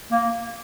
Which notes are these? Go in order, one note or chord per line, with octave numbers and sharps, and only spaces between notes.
A#3